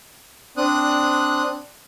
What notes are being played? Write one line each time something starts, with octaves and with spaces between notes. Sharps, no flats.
C4 D4 D#6 F#6